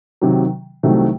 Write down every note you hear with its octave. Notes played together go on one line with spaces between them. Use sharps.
C3 D#3 F#3
C2 C3 D#3 F#3 A3